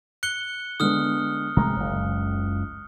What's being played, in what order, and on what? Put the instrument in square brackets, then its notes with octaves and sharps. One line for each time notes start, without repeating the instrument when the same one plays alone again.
[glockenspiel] F#6 C#7 G7
[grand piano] D3 G#3 B3 [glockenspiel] D#6 F6
[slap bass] C3 G#3 A3 [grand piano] A#5
[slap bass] F#1 C#2